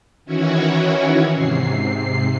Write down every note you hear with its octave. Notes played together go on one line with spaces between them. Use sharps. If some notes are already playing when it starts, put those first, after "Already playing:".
D#3 E3 C#4 E4 F#4 C#5
G#2 C3 C7